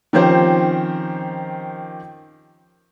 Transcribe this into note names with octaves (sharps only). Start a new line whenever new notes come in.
D#3 F3 C4 C#4 G4 C5